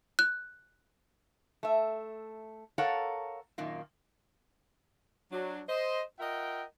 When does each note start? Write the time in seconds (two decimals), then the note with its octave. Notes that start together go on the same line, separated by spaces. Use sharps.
0.19 F#6
1.63 A3 E5
2.78 A4 A#4 C#5 F5 F#5
3.58 F#2 A#2 D#3 A#3
5.32 F#3 D4
5.69 C5 D#5
6.20 F4 A#4 D#5 E5 F#5 G5